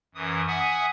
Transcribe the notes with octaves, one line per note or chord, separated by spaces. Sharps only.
F#2 E3 D#6
E5 F#5 G#5 D#6